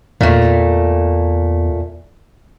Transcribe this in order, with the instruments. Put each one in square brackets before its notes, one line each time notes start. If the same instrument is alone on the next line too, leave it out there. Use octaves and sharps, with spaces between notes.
[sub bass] E2 [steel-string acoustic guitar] A#2 A3